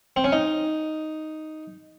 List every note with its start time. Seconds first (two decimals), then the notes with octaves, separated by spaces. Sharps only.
0.16 C4
0.24 C#4
0.32 D#4